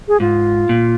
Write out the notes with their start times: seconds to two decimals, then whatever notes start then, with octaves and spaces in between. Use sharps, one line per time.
0.08 G#4
0.20 G#2 F4
0.69 A#2